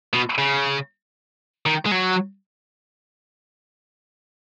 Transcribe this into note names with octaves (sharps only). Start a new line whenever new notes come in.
B2
C#3
D#3
G#3
F#3